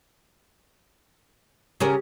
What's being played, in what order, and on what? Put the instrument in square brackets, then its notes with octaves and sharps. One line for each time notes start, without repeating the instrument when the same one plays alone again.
[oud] C#3 C#4 A#4 [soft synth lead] G4